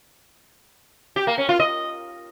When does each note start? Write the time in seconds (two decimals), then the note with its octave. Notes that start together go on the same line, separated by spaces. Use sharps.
1.16 G4
1.27 A#3
1.38 C#4
1.49 F4
1.60 D#5